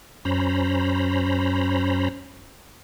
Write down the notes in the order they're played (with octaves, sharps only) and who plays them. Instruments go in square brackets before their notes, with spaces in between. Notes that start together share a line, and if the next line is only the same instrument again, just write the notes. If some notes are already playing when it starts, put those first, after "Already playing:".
[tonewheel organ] F#2 C#4 C5 A#5 B5